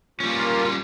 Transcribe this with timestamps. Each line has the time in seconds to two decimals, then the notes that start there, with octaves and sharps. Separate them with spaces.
0.20 G3 A#3 C#4 F4